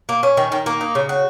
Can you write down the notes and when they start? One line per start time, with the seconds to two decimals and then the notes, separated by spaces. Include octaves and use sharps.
0.09 A#3
0.23 C#4
0.37 D#3
0.52 D#3
0.66 A#3
0.81 D#4
0.95 C#3
1.09 F#4